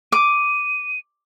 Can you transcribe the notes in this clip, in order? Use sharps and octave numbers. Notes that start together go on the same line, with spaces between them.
D6 D#7